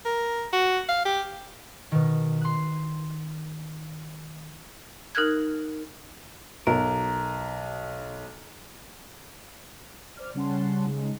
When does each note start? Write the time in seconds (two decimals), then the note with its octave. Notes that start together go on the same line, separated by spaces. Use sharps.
0.05 A#4
0.53 F#4
0.89 F5
1.05 G4
1.92 B2 D#3
2.41 C6 F#6
5.15 D#4 A#4 F6 F#6 G#6
6.67 B1 A#4
10.17 C5 D5 F6
10.35 C#3 G3 C#4 F#5 A5 C6
10.86 C#3 G#3 D#4